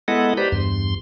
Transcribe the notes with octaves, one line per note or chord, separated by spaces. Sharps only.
G#3 B3 E4 A4 D#5 F#5
G4 B4 C5 D5 A#5 B5
E2 G2 C6